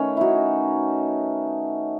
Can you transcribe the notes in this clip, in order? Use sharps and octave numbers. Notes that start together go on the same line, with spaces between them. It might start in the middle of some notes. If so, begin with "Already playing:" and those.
Already playing: D#3 A3 C#4 B4
D#4 E4 F#4